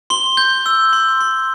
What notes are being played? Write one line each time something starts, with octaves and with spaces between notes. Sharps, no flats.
C6 G7
G6
E6
C6
C6